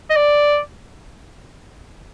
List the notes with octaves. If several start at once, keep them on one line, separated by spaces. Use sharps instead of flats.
D#5
D5